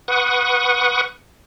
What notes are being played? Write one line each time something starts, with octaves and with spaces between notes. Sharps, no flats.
B4 F#5 C#6 D#6